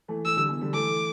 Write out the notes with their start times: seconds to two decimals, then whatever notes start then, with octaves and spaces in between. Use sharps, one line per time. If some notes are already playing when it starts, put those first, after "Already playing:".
0.08 E3 A3
0.25 E3 A3 E6
0.37 D3 G3
0.49 B2 E3
0.61 D3 G3
0.73 E3 A3 D6